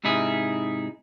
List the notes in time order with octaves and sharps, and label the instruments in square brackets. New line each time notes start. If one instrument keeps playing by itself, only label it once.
[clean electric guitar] G#2 C3 D#4 E4 G#4